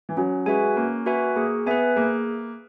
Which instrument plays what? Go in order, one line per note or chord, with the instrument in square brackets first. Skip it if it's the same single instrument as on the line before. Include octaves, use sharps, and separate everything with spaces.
[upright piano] E3
[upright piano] F#3 [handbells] C#4
[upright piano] G#3 [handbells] F#4 B4 E5 G#5
[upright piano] A#3 [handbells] C#4
[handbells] F#4 B4 E5 G#5
[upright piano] A#3 [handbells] G#4
[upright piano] B3 [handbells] B4 E5 G#5
[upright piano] A#3 [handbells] G#4